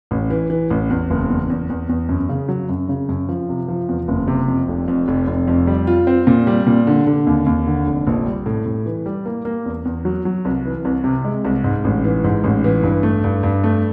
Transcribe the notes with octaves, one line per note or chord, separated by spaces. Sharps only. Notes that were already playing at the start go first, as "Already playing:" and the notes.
A1
E3
E3
A1
E2
F#1
E2
E2
E2
E2
F#2
C#3
F#3
F#2
C#3
F#2
F3
C3
F3
E2
F#1
C3
F2
F1
F2
F1
F1
F2
G3
F4
C4
A#2
G3
A#2
D3
D3
D#2
D#2
D3
F1
A#1
G3
A2
A2
E3
G3
A#3
A#3
E2
E2
F#3
F#3
C2
E3
C2
C3
G#3
C2
G#2
A1
E3
G#2
A1
E3
G2
A3
G2
G2
A3